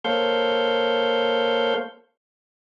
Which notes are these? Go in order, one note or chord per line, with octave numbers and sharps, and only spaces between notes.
A#3 A4 C5 C#5 F5 G6